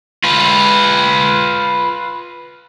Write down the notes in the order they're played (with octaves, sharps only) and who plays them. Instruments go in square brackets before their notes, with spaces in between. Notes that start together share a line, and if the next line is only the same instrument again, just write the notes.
[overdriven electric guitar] F4 B4